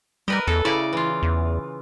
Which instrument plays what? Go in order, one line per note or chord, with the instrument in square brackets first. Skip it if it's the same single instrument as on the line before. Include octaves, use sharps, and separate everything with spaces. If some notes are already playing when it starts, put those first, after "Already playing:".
[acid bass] G3 [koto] A#4 B4 D#5
[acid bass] E2 [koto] A4
[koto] C#3 D5 A#5 [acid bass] E4
[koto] E3 F4
[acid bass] E2